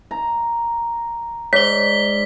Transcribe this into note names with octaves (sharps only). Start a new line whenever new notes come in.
A#5
G#2 C#5 D5 B6 G7